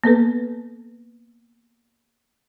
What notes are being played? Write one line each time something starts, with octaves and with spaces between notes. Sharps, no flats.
A#3 B3 A4 B4